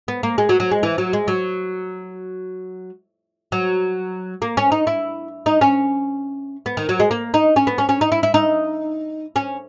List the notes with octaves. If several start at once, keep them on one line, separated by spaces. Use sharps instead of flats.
B3
A#3
G#3
F#3
F#3
G#3
E3
F#3
G#3
F#3
F#3
A#3
C#4
D#4
E4
D#4
C#4
B3
D#3
F#3
G#3
A#3
D#4
C#4
B3
C#4
C#4
D#4
E4
E4
D#4
C#4